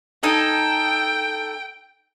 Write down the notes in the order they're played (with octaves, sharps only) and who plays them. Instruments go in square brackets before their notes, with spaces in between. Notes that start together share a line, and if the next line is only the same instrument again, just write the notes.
[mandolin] D#4 A4 G#5 [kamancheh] G5